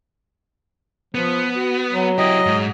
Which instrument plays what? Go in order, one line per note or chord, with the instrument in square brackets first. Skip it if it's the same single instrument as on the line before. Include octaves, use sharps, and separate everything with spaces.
[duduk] F3 [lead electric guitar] B3
[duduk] F#4
F#3
[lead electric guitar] E4 G4 [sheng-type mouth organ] D#5
[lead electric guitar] G#2